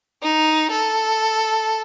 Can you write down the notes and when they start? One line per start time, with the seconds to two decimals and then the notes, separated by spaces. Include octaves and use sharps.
0.23 D#4
0.71 A4